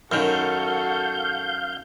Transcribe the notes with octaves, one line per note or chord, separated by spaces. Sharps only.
F#2 D#3 F#4 A4 F5 G6